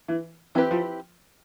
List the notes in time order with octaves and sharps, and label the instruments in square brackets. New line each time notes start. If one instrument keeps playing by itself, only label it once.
[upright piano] E3
[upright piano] E3 [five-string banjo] C4 E4 G4 B4
[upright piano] F3